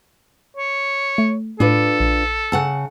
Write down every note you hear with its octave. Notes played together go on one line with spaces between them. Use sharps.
C#5
A3
A2 D4 F4 A4 B4
A#1
C#3 F#5 A5 E6 F#6